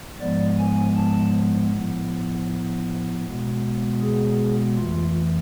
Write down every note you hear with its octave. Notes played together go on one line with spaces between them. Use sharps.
G#2 F3 G#3 B3 D5
G#5
A5
A2 F3 B3
B2 G#3 B3
G#4
F2 E3 A3 F4